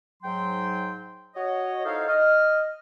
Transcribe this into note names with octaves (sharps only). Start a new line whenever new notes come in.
G#2 F#3 G5 C6
F#4 C#5 D#5
D#4 E4 A4 C5 C#5 F5
D#5 F6